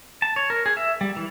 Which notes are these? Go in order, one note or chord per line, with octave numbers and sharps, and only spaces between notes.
A5
C#5
A#4
G#4
E5
G3
E3